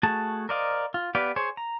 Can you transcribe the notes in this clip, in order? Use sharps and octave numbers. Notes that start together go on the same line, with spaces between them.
A3 F#4 G#4 A5
A#4 C5 D5 D#5 F5
F4
B3 G4 B4 D5 F5
G#4 C5 C#5
A#5